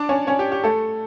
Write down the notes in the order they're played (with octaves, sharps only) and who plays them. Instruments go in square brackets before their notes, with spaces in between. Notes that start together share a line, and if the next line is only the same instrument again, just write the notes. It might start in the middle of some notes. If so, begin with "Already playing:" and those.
Already playing: [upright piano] D4 D5
C#4 C#5
C#4 C#5
G4
G4
A3 A4